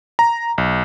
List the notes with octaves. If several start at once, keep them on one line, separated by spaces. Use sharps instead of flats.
A#5
B1